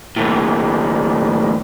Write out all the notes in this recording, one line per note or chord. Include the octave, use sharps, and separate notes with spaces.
D#2 A2